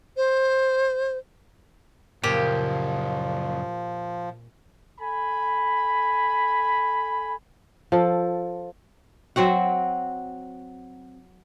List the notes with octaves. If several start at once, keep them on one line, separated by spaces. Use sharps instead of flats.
C5
F#2 A#2 C#3 F3 G4
A4 G#5 B5
F3 A4
F#3 C4 F#4 F#5